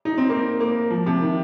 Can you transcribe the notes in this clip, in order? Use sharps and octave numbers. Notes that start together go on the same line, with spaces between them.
D#4
C4
A#3
A#3
F3
C3
D#3